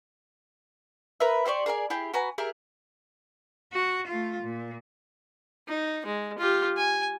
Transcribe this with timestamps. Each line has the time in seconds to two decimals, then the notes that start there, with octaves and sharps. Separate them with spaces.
1.20 A#4 B4 E5
1.45 G4 C5 D5 C#6
1.66 G#4 A#4 D5 G#5
1.90 E4 G4 G#4 G5
2.14 F#4 B4 G#5 A#5
2.38 G4 G#4 A#4 E5
3.73 F#4
4.08 A3 F4
4.43 A#2
5.68 D#4
6.06 G#3
6.38 F4 G4
6.77 G#5